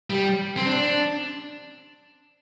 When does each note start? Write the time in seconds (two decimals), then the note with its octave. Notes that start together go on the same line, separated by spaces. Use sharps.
0.10 G3
0.57 C4
0.66 D4